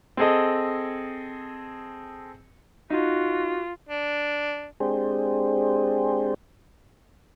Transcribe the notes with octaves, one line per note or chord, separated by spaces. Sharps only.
C4 G#4 A4 D#5
D#4 F4 F#4
D4
G#3 C4 D4 G4 G#4 C5